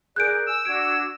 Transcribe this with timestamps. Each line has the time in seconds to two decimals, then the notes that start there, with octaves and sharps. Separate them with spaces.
0.16 G#4 A#4 D5 F#6 G6 D7
0.47 G#5 E6
0.65 D4 F#4 G#6 D7